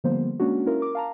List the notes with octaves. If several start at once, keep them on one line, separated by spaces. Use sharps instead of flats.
D3 F3 G3 A#3 B3 C5
G#3 A#3 C#4 D4 F#4
C#4 E4 F4 A#4
A#4 D6
F5 A5 A#5